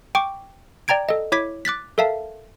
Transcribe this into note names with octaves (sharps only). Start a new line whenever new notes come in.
G5 C#6 D6
D5 G5 A#5 G#6 D7
A4 D#5
E4 C#5 D6 G#6 B6
D6 F#6 A6 B6
A4 A#4 E5 F5 A5